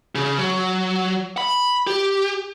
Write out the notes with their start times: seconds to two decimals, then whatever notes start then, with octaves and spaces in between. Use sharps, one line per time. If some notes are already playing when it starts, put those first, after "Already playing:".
0.15 C#3
0.38 F#3
1.38 B5
1.87 G4